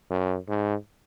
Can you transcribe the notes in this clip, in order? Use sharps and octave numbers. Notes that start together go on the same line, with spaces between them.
F#2
G#2